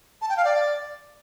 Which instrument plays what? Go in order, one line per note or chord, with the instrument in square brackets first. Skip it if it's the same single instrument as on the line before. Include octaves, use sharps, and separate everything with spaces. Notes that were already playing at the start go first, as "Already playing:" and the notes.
[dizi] A5
G5
F5
D5